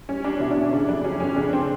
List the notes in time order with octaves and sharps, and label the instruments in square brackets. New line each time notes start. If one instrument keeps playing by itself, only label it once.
[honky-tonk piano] G3 C#4
G3 D4
B2 E4
D4
B2 C#4
C#3 D4
F2 D4
F#3 C#4
F2 C#4
C#3 D4
C4